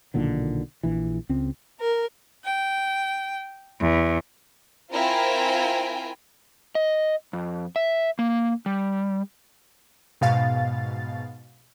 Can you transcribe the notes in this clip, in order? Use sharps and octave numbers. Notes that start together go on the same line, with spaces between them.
B1 A#2 D3 D#3
A#1 E3
C#2 C4
A#4
G5
E2
C4 E4 F4 A#4 G5 G#5
D#5
F2
E5
A#3
G3
G#2 B2 F5 A6